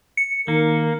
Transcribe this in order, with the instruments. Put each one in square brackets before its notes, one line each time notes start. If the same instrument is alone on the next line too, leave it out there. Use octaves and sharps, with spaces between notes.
[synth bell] C#7
[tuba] D#3 [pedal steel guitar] A#3 [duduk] A#4